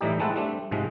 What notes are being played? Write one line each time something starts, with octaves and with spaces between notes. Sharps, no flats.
A2 E3 G3 D#4 G4
G#3 A3 C4 E4 A4 F#5
G3 A3 C4 D4
G#2 C3 F3 G#3